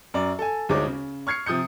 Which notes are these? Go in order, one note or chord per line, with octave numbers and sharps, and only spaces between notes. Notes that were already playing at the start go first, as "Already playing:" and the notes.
F#2 D5 A#5
A4 G#5
G1 D2 G#3 D#4 C#5 D6
C#3
C#6 F6 G#6 C7 C#7
C3 F3 D#6 G6 C#7